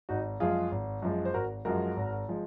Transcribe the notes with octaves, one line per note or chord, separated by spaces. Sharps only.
G#1 D#4 F#4
F#2 F3 G#3 F4 G#4
G#1
F#2 F3 G#3
C5
G#1 F#4 A#4
F#2 F3 G#3 F#4 A#4
G#1
F3 G#3